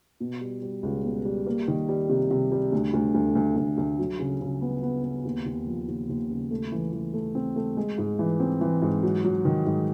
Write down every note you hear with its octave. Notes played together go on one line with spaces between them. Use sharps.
B2
G3
G3
C#2
B2
G3
A#3
D#3
G3
C3
C3
G3
D2
D2
D2
D2
D2
D2
F#3
C#3
C#3
B3
B3
B3
D#2
D#2
F3
D#2
D#2
C#3
A3
E3
E3
A3
C4
A3
G#3
G#2
E3
C4
E3
G#2
F#3
F#3
D#3
G#2